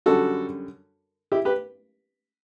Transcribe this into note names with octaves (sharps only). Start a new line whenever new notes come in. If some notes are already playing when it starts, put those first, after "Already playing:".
F#2 D3 G3 F#4 A4
E4 G4
G4 B4